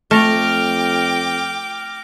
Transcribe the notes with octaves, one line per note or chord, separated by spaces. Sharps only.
F2 A3 G5 D6 F6 A#6 F7